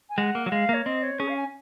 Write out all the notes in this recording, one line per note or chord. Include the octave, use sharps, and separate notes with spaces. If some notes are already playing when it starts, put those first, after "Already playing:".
G#5
G#3 F#5
A#3
F#3 F#5
G#3 F5
A#3 C#5
C4 D#5
C#5
C#4 G#4
F5
G#5